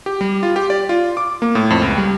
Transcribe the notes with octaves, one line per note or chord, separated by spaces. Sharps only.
G4
G3
F4
G4
D5
F4
D6
A#3
A2
F2
C#2
G3